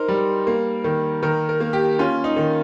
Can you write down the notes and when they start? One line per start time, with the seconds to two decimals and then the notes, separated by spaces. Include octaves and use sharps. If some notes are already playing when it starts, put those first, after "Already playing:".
Already playing: D#4 A#4 C5
0.08 G3
0.47 A#3
0.84 D#3
1.23 D#3 A#4
1.49 A#4
1.60 A#3
1.73 G4
1.99 C#4 F4
2.24 D#4
2.36 D#3